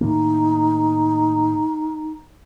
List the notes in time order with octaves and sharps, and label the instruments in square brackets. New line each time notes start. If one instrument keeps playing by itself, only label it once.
[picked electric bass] A2 D#3 A#3 [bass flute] D#4